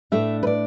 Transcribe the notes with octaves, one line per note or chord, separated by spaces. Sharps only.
A2 A3 D4 E5
B4
D5